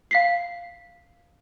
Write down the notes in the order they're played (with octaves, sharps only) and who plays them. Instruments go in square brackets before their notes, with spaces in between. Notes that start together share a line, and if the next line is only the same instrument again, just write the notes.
[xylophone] F5 B6 C7